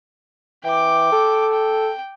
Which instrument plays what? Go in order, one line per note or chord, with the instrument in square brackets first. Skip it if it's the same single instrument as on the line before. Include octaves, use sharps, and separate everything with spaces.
[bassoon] E3 [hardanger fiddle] G5 D6
[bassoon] A4
[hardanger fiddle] G5